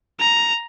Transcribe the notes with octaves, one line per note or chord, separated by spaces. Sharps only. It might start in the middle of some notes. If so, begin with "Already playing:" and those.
A#5